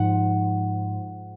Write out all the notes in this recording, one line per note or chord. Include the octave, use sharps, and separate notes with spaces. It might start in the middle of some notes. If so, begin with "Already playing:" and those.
Already playing: G#2 F3 F#5